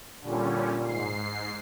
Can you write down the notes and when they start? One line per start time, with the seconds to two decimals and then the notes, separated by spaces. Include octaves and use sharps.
0.21 A#2 D3 G3 C#4
0.84 G#2 C7